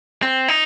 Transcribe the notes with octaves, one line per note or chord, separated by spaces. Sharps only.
C4
D#4